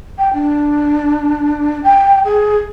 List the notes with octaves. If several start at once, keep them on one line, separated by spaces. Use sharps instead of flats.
G5
D4
G5
G#4